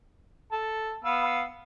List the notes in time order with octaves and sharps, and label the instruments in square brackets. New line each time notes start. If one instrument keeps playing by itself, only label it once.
[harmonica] A4
B3 F5 E6